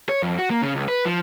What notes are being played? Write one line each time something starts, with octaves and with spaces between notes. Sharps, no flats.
C#5
F2
F#4
A#3
C#3
C#2
B4
F3